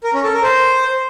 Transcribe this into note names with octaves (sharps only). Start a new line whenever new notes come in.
A#4
C#4
A4
A#4
C5